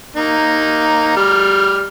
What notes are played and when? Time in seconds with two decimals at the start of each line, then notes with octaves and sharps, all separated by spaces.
0.16 A#3 D#4
1.16 G3 F6